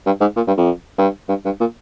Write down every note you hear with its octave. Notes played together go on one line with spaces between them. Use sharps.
G2
G#2
A#2
G2
F2
G2
G2
G2
A#2